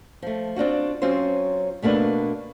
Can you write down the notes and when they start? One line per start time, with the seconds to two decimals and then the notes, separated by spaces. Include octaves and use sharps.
0.22 F3 A3
0.56 C4 D4 F4 F#4
1.02 F#3 C4 C#4 F4 C5
1.82 B2 A3 A#3 D4 B4